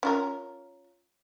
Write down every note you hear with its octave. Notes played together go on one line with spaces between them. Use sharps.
C#4 F4 A#4